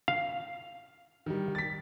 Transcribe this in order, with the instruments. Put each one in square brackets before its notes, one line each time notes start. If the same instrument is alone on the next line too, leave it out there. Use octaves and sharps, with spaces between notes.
[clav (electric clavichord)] F5
[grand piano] D#3 G3
A6 B6